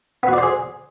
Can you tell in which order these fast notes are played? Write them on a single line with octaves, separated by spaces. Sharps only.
B3 F#4 D5 C5 G#4